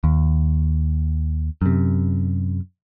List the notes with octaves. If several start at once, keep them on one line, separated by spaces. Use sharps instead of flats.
D#2
F#2 C3